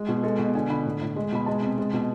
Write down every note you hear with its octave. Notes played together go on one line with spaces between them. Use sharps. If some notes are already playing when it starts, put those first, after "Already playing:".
Already playing: G#3
B2 G#4
G#3 A4
B2
D3 G#5
D3 B5
A2
A2
G#3
B2 B5
G#3 A5
C3
G#3
B2